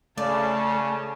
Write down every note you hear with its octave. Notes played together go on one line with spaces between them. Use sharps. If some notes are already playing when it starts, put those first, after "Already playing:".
C#3 A3 D5 A5